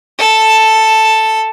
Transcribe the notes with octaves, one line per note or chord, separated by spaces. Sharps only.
A4 A5